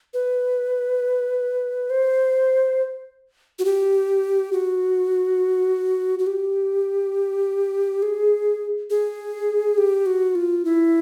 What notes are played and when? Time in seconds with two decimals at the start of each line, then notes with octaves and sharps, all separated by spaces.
0.14 B4
1.90 C5
3.59 F#4
3.65 G4
4.53 F#4
6.19 F#4
6.27 G4
8.02 G#4
8.90 G#4
9.78 G4
10.06 F#4
10.35 F4
10.65 E4